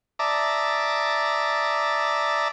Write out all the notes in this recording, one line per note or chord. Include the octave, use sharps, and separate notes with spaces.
D5 E5 A5 A#5 D6 D#6